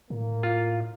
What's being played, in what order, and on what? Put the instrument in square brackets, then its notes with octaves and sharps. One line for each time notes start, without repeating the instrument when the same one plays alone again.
[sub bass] A2 [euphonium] A#3
[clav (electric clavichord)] F4